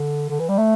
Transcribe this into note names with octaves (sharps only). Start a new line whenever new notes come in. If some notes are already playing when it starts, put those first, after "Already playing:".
Already playing: D3
D3
E3
G3
A3